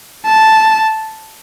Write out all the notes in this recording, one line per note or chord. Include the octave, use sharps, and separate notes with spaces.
A5